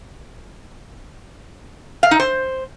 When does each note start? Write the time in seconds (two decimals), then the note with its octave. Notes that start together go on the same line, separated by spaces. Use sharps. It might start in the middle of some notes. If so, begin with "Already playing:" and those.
2.03 F5
2.11 D#4
2.20 C5